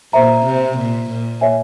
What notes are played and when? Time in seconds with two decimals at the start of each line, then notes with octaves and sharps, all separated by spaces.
0.13 A#2 C5 E5 A#5
0.45 C3
0.77 A#2
1.10 A#2
1.41 C#5 E5 G#5